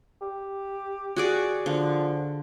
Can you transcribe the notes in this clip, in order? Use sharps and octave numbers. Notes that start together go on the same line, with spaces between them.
G4
F#4 G#4 D5
D3 F3